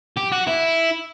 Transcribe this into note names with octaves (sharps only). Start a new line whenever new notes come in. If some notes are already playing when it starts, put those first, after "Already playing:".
G4
F#4
E4